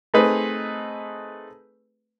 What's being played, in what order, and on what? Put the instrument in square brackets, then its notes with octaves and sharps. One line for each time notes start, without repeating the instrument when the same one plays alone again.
[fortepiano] A3 C4 D#4 G#4 B4